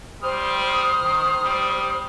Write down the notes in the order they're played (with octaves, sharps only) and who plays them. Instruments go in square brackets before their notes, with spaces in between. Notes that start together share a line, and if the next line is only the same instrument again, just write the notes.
[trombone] G3 [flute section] C5 D#6 F6
[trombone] D#3
G3